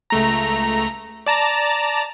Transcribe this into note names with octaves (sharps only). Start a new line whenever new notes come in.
C#2 A3 A#5
D5 A5 A#5